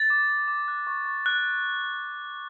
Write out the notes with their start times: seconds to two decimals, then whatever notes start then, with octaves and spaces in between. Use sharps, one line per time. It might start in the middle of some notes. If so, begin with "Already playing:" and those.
Already playing: A6
0.10 D6
0.29 D6
0.48 D6
0.68 F#6
0.87 C#6
1.06 C#6
1.26 F#6